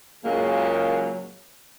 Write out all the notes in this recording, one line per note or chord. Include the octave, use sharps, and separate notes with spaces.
A#2 C#3 F#3 G#3 A#3